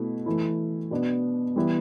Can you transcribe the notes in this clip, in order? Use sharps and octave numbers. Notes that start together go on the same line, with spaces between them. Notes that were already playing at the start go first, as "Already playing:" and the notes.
Already playing: B2 A3 E4
E3 A3 E4
B2 B3 D4
E3 G3 B3 E4